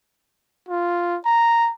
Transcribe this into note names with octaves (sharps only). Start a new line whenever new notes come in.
F4
A#5